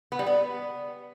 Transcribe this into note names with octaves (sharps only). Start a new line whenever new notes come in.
B3
G3
B3